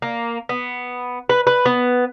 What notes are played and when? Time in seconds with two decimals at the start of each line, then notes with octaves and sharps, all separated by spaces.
0.02 A#3
0.49 B3
1.29 B4
1.47 B4
1.66 B3